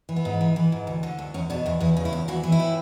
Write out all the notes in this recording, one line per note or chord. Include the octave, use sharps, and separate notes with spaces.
E3
B3
G#2
E3
E3
G#2
D2
D3
D2
E2 C#4
B2 D4
E2 E4
E2 E4
C#3
E4
E2
E3 F#4
E3
E4
A2